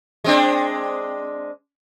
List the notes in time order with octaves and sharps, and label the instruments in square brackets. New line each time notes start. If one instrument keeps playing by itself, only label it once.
[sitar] G#3 C4 D4